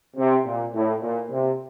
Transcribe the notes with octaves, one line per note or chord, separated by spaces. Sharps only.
C3
A#2
A2
A#2
C3